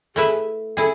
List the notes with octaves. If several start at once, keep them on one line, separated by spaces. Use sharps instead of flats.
A3 E4 G#4 B4 E5
E4 G#4 A4